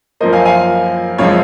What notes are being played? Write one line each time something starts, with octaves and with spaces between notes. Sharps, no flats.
F#2 F3 A#3 C5 D#5
F5 G#5
F5 G#5
F#2 C#3 F3 G#3 C#5 F5